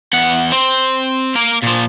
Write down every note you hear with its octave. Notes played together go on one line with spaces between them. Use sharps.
E2 F#5
C4
A#3 A#4
A#2 F3